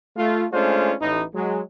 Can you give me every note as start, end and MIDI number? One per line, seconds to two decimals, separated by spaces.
0.17 0.46 57
0.17 0.46 65
0.52 0.93 56
0.52 0.93 57
0.52 0.93 61
0.52 0.93 62
0.52 0.93 65
0.52 0.93 72
1.01 1.23 33
1.01 1.23 52
1.01 1.23 63
1.35 1.61 54
1.35 1.61 56